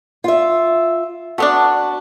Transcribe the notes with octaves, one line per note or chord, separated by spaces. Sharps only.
F4 E5
A3 B3 D4 F#4